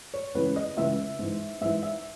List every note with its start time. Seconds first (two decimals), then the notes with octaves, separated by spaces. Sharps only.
0.14 C#5
0.35 C#2 C#3 E3 B4
0.56 D#5
0.77 C#2 C#3 E3 E5
1.19 G#2 E3
1.61 G#2 E3 E5
1.83 E5